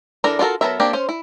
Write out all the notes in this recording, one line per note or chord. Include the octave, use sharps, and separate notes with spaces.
E3 D4 A4 A#4 A#5
D4 F4 F#4 A4 A#4
F#3 B3 A4 A#4 E5
A#3 C4 D4 G4
C#4 C5
E4